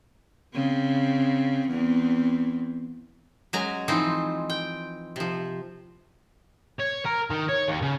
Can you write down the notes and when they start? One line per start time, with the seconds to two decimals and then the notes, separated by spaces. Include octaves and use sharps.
0.53 C#3 C4
1.69 E2 C4
3.53 F#3 G#3 C#4 G#5 A#5
3.88 E3 F3 C4 D#4
4.50 G5
5.16 C3 F3
6.80 C#5
7.06 A#4
7.31 D#3
7.49 C#5
7.68 D#2
7.82 C#3